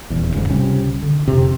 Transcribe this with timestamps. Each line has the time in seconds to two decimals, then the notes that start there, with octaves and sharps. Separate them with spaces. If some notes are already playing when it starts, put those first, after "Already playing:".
0.10 D#1 E2
0.35 F1 D2 G#2 C#3
0.49 C#2 C3 G3 C#4
1.03 D3
1.27 F2 C3 C4